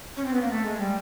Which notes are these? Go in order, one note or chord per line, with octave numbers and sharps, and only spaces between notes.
C#4
C4
B3
A#3
A3
G#3
G3